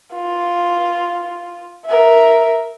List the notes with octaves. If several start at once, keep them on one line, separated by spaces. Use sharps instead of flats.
F4
A#4 E5